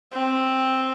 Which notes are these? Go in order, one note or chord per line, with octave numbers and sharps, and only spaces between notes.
C4